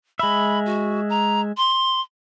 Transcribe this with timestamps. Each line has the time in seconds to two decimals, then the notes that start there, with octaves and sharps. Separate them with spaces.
0.19 G#3 E5 B5
0.66 F#4
1.10 A#5
1.57 C6